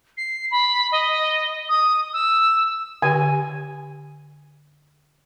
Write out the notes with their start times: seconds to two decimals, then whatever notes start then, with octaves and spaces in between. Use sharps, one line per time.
0.17 C7
0.51 B5
0.92 D#5
1.69 D#6
2.13 E6
3.02 D3 G4 G#5